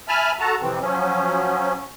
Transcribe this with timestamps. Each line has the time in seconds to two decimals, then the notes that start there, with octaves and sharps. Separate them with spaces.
0.08 E5 G#5 A5 B5 F6
0.40 F#4 A4 A5 A#5
0.62 F2 C3 E3 C4
0.81 F3 F#3 C#4